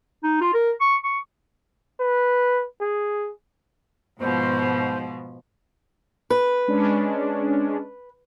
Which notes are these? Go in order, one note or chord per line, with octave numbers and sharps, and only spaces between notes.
D#4
F4
A#4
C#6
C#6
B4
G#4
G#2 B2 F3 C5
B4
G#3 C#4 D4